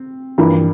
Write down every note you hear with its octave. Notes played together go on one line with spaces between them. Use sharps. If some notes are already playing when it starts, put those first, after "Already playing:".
Already playing: C4
G2 E3 F3 A#3 E4